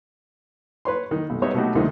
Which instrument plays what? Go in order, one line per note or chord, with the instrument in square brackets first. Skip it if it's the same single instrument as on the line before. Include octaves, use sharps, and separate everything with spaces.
[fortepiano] B4 C#5 C6
D#3
B1
G3 B3 D#4 C#5 E5
B2 F#3 A3 D#4 F#4 G4
D2 C3 D#3